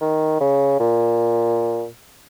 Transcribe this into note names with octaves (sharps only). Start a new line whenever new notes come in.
D#3
C#3
A#2